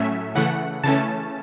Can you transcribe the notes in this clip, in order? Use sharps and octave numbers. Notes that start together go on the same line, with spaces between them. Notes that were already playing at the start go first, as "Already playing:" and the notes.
Already playing: A2 F#3 A3 C#4 E5
C#3 E3 A3 F#5
C#3 E3 A3 C#4 A5